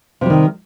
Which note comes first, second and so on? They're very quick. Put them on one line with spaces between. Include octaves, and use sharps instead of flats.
C3 G3 D#3